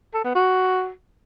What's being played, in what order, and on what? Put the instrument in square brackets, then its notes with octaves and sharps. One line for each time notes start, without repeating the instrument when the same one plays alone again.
[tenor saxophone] A4
B3
F#4